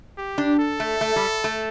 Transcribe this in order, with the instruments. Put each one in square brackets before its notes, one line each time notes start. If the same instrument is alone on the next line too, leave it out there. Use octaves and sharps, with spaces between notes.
[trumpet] G4
[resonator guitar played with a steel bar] D4
[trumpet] A4
[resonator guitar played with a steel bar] A3
A3
G3
A3